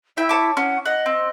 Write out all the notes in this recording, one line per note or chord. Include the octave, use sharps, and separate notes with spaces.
E4 E5 G5
C#5 A5 D6
C#4 F#5
D#5 F#5
C4